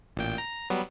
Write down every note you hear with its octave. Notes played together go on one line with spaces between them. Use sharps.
A1 A#2 G5
A#5
F#3 G3 B3